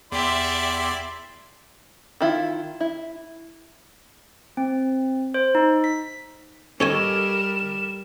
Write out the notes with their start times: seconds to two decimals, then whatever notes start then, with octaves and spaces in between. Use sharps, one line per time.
0.12 E2 E4 G4 D5 E5 C6
2.20 D#3 E4 F4
2.80 E4
4.57 C4
5.34 C5
5.55 D#4
5.84 B6
6.80 G3 C#4 A4 A#4 C#5 D#5 G#5 E7